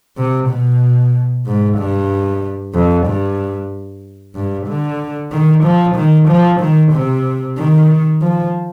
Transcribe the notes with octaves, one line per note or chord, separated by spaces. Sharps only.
C3
B2
G#2
G2
F2
G2
G2
D3
D#3
F3
D#3
F3
D#3
C3
D#3
F3